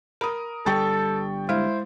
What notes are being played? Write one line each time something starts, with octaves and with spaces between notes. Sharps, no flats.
A#4 B5 D#6
G1 G2 G3 A4 G5 C#6 A6
G#3 E4 C5